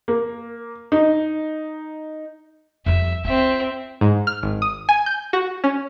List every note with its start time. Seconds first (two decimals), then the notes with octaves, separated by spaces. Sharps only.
0.08 A#3
0.92 D#4
2.86 F2 G3 E5
3.25 C4 F4 E5
4.01 G#2
4.27 F6
4.43 G#1
4.62 D#6
4.89 G#5
5.06 G6
5.33 F#4
5.64 C#4